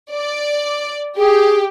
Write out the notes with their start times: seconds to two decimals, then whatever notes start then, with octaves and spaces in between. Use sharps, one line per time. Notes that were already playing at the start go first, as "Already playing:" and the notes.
0.12 D5
1.17 G4 G#4